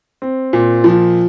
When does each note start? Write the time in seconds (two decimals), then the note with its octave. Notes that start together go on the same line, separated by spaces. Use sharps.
0.22 C4
0.53 A#2
0.84 F3